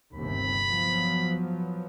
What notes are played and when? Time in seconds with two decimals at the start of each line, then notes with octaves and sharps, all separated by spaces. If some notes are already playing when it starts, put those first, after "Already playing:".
0.15 G1 D#2 C3 B5
0.67 F3 F#3 B3